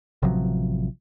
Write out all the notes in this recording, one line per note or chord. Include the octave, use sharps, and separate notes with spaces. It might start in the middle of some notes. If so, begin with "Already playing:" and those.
A1 C3 F3 F#3